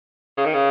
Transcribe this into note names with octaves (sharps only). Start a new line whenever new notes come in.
C#3
D#3
C#3